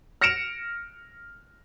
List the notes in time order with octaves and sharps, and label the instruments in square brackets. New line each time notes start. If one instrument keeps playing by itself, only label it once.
[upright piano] F6 A#6 C#7 D7 E7 F7